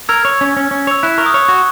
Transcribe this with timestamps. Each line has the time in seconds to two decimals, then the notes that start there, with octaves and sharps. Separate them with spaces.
0.09 A#4 E6 G#6
0.25 C#5
0.41 C#4
0.57 C#4
0.71 C#4
0.87 C#5 E6
1.03 E4 F#6
1.18 A#4 C#6
1.26 D#6
1.34 C#5
1.48 F#4 C#6